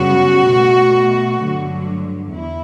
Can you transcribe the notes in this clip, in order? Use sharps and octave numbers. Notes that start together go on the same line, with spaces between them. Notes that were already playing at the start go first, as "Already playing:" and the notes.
Already playing: F#2 C#3 G3 B3 F#4
B2 A3
G2 D3 F#3
E2 E4